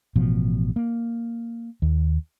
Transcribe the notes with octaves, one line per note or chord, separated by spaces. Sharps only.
A1 B2 F3
A#3
D#2